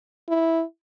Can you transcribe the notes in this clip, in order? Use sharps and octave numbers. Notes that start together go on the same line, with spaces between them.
E4